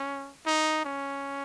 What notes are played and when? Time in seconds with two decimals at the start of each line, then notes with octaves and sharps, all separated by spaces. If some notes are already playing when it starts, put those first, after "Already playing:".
Already playing: C#4
0.46 D#4
0.85 C#4